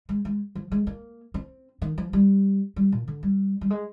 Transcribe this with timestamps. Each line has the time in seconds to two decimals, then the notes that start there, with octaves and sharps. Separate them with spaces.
0.09 G#3
0.25 G#3
0.55 F3
0.72 G#3
0.87 A#3
1.34 C4
1.82 D#3
1.98 F3
2.13 G3
2.76 G3
2.92 A#2
3.08 D3
3.23 G3
3.61 G3
3.70 G#3